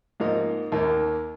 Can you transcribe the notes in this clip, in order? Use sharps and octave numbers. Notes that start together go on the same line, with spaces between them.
G#2 F3 A#3 D#4
D#2 D#3 A#3